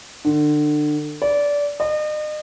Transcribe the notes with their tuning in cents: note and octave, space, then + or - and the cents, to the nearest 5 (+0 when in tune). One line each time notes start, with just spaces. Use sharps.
D3 +30
D5 -20
D#5 -40